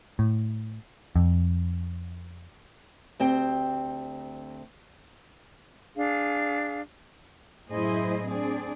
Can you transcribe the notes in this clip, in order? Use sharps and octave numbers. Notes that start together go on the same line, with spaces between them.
A2
F2
D2 C4 G4 G5
D4 G#4 F5
F#2 A2 E4 G#4 C5 D#5
C4 D4 G#4 D5